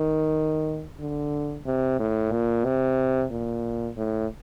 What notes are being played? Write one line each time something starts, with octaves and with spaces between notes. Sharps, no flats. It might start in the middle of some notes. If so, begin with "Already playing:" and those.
Already playing: D#3
D3
C3
A2
A#2
C3
A#2
A2